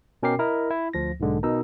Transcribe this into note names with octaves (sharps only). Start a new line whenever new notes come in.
B2 C#4 A#4 G5 D6 C7
E4 A#4 D#5
E4
D2 F3 A#6
B1 G#2 D3 G#3
B2 D#4 A#4 E6